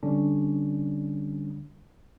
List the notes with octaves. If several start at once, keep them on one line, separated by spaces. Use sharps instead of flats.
D3 G3 C#4 D4